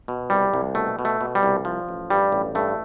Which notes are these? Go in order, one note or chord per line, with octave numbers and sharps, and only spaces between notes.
B2
C2 G3
C2
B2 A3
B2
A3
B2
G3
C2
F3
A1
G2 G3
A1
G2 A3